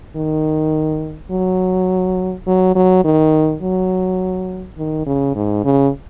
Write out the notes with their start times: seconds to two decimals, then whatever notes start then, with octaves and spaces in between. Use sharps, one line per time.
0.16 D#3
1.31 F#3
2.47 F#3
2.75 F#3
3.05 D#3
3.62 F#3
4.78 D#3
5.06 C#3
5.35 G#2
5.65 C#3